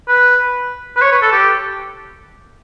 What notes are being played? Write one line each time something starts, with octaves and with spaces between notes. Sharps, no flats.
B4
B4
C#5
B4
A4
G4